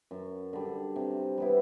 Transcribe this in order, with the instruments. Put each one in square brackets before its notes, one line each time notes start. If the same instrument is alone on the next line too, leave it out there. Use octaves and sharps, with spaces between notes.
[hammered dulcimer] F#2
D3 G3
C3
G3 B3 E4